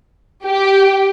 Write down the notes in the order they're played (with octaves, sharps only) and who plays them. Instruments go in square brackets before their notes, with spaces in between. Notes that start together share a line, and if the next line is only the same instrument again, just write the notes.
[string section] G4